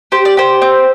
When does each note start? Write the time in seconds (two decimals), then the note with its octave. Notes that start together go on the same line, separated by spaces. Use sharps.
0.12 G4 C5
0.25 D5
0.37 G4 C5
0.62 C4